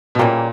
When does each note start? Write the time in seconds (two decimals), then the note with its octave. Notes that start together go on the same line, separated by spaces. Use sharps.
0.15 B2
0.19 A#2 C#3 E3 G3 A#3